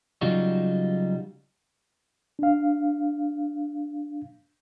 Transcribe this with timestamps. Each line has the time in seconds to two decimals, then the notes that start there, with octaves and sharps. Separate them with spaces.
0.21 C#3 F#3 G3 D#4 F4 F#4
2.39 D4 F5